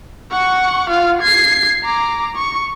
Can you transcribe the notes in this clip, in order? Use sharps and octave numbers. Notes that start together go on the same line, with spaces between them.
F#5 C#6
F4 F5
G#6 C7
A#5 D6
C#6